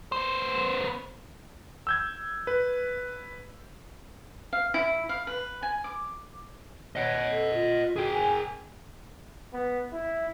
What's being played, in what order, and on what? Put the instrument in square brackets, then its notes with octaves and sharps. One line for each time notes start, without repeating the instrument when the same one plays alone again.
[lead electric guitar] B3 C5
[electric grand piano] E6 G6 G#6
B4
[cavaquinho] F5
E4
F5
B4
G#5
D6
[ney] C#5 [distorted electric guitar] D#5 F#5
[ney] A4
F4
[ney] F#4 [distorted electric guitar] G#4 G5
[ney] G#5
[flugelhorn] B3
E4